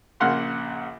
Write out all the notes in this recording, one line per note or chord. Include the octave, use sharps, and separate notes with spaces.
A#1 C#3 A#3 F#5 C6 F6